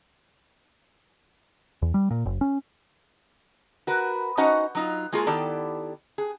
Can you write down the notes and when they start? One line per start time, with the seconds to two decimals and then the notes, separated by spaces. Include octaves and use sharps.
1.82 E2
1.94 G3
2.11 A#2
2.26 F#1
2.41 C#4
3.87 F#4 A#4 B4
4.37 C#4 D#4 F#4 C5 D#5 F#5
4.75 F#3 D#4 F4
5.12 G#3 A#3 F4 F#4 G#4
5.27 D#3 B3 E4 G4 A4 D5
6.18 G#4